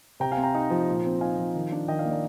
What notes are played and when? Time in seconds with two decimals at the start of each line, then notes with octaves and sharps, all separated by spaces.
0.20 C3 G5 A#5
0.32 F5 G#5
0.37 C4
0.43 G5 A#5
0.55 D#4
0.70 F3
0.88 A#2
1.05 C4
1.21 D#4 F5 G#5
1.38 F3
1.55 D#3
1.72 D4
1.88 D#3 D#5 G5
1.99 D5 F5
2.05 A#3
2.10 A#4 D5